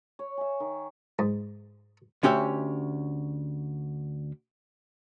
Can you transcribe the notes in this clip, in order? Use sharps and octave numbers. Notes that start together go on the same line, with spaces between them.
C#5
E5 G#5
D#3
G#2
D2 C#4 G4 E5